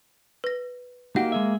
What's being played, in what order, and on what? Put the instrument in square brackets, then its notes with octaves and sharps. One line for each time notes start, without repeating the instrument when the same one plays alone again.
[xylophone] B4 A#6
[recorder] A#3 [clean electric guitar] D#4 F#4 G4 [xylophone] F#5
[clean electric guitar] G#3 G#4 E5